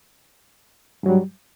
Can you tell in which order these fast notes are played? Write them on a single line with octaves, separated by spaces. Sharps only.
G2 F#3 G3